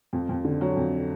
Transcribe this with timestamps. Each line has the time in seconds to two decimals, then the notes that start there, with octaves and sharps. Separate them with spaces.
0.13 F2
0.29 F2
0.44 D3
0.61 F#3
0.77 F2